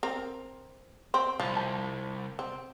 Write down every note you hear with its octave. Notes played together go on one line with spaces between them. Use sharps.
C4 A#4
C4 C6
C2 F3
A5
C4